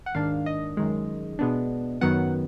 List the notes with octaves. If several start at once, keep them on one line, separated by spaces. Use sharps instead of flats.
F#5
G#2 D#3 A#3 D4 F5
D#5
F#2 D#3 G#3
B2 G#3 B3 D4
F#2 D#3 F#3 B3 F#5